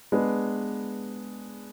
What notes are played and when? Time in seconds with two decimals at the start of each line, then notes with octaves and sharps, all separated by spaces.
0.12 G#3 B3 D4 G#4 B4